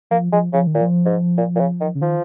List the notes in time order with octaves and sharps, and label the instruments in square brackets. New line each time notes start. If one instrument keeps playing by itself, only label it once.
[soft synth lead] F3 [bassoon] A#3
[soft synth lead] F3 [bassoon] G#3
[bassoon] C#3 [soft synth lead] F3
[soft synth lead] D#3
[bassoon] A#2
[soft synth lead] F3
[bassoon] G#2
A#2
A#2
C#3
D#3
[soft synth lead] C#3
[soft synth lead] D#3 [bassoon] F3